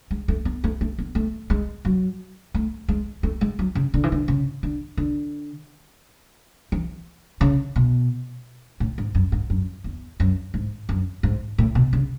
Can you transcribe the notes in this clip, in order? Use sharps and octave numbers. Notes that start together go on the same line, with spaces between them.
G#3
A3
B3
A3
A3
B3
A3
G#3
F#3
A3
G#3
A3
G#3
F#3
C#3
D3
E3
D3
C#3
D3
D3
E3
C#3
B2
A2
G#2
F#2
G#2
F#2
E2
F#2
G#2
F#2
G#2
A2
B2
C#3